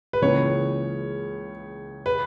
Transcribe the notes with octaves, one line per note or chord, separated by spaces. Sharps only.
B4
C#2 C#3 E3 A#3 C#4 C#5
B4